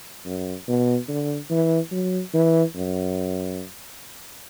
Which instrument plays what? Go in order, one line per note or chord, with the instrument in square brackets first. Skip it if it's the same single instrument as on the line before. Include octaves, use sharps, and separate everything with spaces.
[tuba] F#2
B2
D3
E3
F#3
E3
F#2